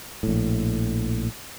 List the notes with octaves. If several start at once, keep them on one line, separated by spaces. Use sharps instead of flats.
A#1 A2